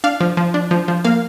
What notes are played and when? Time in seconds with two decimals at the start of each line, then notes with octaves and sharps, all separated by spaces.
0.04 D4 F5
0.20 F3
0.37 F3
0.54 D4
0.71 F3
0.88 F3
1.05 A#3 F5